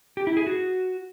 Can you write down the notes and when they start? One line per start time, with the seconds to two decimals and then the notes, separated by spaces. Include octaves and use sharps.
0.17 G4
0.27 E4
0.37 G#4
0.47 F#4